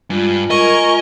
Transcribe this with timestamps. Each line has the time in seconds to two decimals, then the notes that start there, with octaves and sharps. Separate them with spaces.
0.10 G2 G#3 F4
0.50 A#4 D#5 G#5 C#6